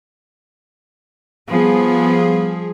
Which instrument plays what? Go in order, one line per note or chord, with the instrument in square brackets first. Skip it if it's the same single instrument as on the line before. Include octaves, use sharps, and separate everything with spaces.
[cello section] F3 G3 G#4 [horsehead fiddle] B3